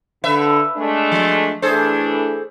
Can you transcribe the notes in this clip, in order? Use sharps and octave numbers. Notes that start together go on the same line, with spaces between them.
D3 B4 E5
G#3 A3 D4
F3
E3 A3 D4 G#4 A4 C5